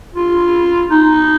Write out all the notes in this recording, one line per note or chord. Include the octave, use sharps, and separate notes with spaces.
F4
D#4